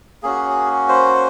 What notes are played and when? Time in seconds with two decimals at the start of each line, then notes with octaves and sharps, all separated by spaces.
0.22 A#3 C#4 F#4 G#4
0.89 C5